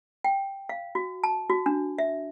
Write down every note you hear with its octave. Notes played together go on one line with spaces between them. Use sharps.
G5
F5
F#4
A5
F#4
D4
E5